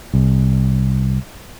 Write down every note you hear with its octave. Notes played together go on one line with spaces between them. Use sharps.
C2